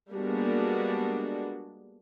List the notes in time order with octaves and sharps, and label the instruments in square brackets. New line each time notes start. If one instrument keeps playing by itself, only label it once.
[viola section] G3 G#3 A#3 B3 D4 F#4